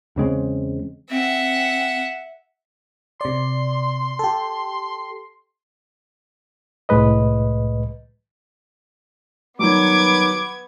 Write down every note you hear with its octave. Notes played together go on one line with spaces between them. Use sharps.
E2 C#3 G#3 C4
C4 E5 F#5
C3 D5 C6
G4 A4
C2 A2 G#3 B4 D#5
D#3 F#3 G3 B3 D6 G#6